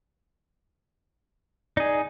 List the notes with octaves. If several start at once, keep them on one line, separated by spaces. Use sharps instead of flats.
D#4 G#4 D5